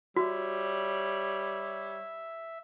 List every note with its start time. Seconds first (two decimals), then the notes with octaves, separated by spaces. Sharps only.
0.16 G3 F#4 C#5 E5